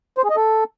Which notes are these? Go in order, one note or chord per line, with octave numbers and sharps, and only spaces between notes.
C5
G#4
D#5
A4